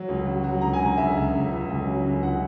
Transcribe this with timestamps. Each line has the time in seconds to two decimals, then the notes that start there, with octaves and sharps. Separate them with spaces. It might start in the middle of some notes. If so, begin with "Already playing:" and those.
Already playing: F#3
0.08 C#2
0.25 F#3
0.44 F#3
0.61 C#2 A#5
0.73 G#5
0.80 C#2
0.85 A#5
0.97 C#2 E5
1.16 C#2
1.34 C#2
1.51 C#2
1.69 C#2
1.87 F#3
2.05 C#2
2.22 C#2 F#5